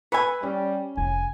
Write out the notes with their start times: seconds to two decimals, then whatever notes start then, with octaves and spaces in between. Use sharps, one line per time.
0.12 B4 C#5 G#5 B5 E6
0.43 G3 C#4
0.97 F1 G#5